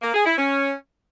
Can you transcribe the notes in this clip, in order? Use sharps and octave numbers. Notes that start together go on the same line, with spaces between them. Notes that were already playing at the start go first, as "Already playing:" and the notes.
A#3
G#4
E4
C#4